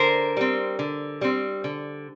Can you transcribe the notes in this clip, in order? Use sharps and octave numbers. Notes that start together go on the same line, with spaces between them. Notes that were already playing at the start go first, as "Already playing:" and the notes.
Already playing: D3 A#4 C5
G3 C4
D3
G3 C4
D3